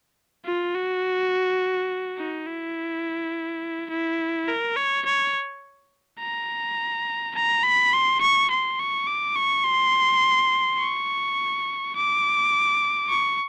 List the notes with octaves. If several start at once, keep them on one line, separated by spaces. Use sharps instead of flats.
F4
F#4
D#4
E4
E4
A#4
C#5
C#5
A#5
A#5
B5
C6
C#6
C6
C#6
D6
C#6
C6
C#6
D6
C#6